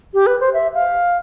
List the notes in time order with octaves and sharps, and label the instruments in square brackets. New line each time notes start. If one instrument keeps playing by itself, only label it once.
[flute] G4
B4
C5
E5
F5